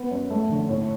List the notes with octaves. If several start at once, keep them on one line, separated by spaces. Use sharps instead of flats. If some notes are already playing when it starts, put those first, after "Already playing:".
Already playing: B3
F#2
A3
D3
A2